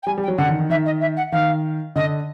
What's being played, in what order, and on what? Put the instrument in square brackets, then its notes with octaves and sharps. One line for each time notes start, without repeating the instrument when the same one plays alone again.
[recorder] G5
[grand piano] G3 [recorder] G#5
[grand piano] G3
[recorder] G5
[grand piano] F#3
[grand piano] D3 [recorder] F#5
[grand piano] D#3
D#3
[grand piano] D#3 [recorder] E5
[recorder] D#5
E5
F#5
[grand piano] D#3 [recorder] F5
[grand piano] D3 [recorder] D#5